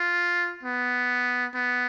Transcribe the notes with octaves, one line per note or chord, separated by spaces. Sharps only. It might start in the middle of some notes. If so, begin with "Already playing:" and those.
Already playing: F4
B3
B3